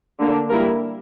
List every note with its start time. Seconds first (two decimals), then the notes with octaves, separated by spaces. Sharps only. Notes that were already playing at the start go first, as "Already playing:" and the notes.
0.19 D3 A#3 D4
0.50 G3 A#3 E4 A#4